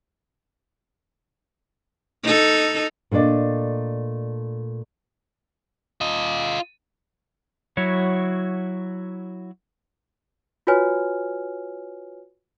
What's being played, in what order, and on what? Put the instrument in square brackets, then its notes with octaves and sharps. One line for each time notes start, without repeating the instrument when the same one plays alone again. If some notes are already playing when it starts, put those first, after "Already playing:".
[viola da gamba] D#4 A4
[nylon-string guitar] A#2 A3 D4 D5 D#5
[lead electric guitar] F4 D#5
[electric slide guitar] F#3 E4 F#4 C#5
[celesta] F4 F#4 B4 C#5 G#5 F6